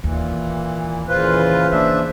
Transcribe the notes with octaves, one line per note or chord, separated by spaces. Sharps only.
D#2 A#2 E3
A#2 C#3 E3 F4 B4 C5
A#3 D4 E5